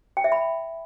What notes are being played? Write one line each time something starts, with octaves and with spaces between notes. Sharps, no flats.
G5
E5
B5